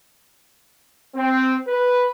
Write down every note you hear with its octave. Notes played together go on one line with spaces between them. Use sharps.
C4
B4